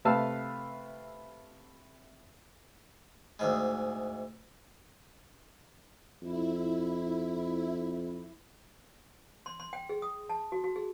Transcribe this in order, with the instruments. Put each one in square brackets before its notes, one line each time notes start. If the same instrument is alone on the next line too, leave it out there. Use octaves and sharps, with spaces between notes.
[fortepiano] C3 A3 B4 F5 A5 E6
[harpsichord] D2 G#2 G#3
[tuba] F2 [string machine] E4
[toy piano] C6
C6
G5
G#4
D#6
A5
F#4
F#4
G#4